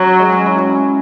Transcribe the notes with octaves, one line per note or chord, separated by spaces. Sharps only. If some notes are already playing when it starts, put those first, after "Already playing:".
Already playing: F#3 C#4
G#3
C#4
E4
C#4